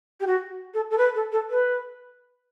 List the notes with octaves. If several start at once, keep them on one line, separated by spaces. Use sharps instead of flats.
G4
F#4
A4
A4
B4
A4
A4
B4